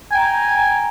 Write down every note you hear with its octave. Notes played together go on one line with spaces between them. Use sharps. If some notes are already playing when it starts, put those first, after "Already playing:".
G5 G#5 A#5